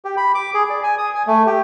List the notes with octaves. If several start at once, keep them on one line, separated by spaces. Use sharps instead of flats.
G4
B5
D6
G#4
D5
G#5
D#6
G#5
A3
G4